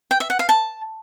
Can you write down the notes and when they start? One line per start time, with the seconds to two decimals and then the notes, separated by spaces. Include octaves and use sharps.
0.11 G5
0.20 E5
0.30 F#5
0.39 F5
0.49 A5